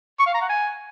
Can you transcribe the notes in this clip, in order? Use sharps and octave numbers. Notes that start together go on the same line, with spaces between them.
C#6
F5
A#5
F#5
G#5